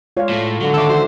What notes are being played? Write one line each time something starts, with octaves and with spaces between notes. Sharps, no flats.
G#3 F4 C#5 D5 F5
A2 A3
D3 F#3
D#3 A4 C#5 E5 D6 E6
E3 F#4 C5